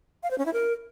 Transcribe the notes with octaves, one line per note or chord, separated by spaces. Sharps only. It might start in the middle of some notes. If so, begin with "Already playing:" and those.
F5
C5
C#4
E4
A#4